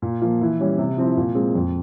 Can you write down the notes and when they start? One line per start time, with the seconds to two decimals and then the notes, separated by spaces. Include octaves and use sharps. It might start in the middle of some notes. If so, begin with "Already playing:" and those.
0.02 A#2
0.22 F3 A#3 F4
0.41 E3
0.60 G3 C#4
0.78 C3
0.98 F3 C4 E4
1.17 A#2
1.35 G#3 C4
1.55 F2